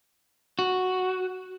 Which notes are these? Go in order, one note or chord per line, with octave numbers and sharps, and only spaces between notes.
F#4